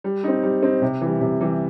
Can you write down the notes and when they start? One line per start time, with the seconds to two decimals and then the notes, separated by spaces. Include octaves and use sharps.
0.04 G3
0.24 C4 D#4
0.43 G3
0.63 C4 D#4
0.82 C3
1.01 E3 G3
1.21 C3
1.41 E3 G3